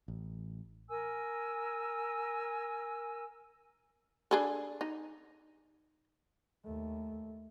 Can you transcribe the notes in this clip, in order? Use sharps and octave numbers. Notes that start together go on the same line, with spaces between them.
A1
A#4 G#5 E6
D4 G#4 A4
D#4
D#2 A3